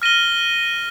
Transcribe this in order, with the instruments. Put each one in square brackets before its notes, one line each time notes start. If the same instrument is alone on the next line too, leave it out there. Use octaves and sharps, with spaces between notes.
[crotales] F6 A#6 D#7 G7